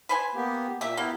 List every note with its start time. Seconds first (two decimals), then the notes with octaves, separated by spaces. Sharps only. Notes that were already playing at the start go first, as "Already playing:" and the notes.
0.09 B4 C5 G#5
0.35 A#3 B3 G4
0.81 A#2 A#3 G4 E5
0.97 A#3 B3 E4 G4